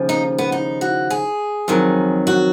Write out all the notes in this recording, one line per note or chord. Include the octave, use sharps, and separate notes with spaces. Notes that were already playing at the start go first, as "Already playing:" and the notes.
Already playing: D#2 C#3 F3
D#4
B3
D#4
F#4
G#4
F2 D#3 F#3
F#4